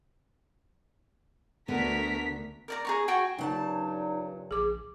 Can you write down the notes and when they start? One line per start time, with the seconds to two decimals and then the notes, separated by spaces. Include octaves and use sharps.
1.68 D2 D3 B3 A#4 B6
2.68 A#4 D5 A#5
2.85 G#4 A#5 C#6
3.08 F#4 G5 G#5 C#6
3.38 G2 A#2 C#3 F#3 D#4 F#5 A5
4.51 A#1 G#4 D6